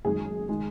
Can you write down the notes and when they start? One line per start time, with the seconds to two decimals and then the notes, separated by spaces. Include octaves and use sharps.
0.04 F#1 F#2 D#3 G#3 G#4
0.49 D#3 G#3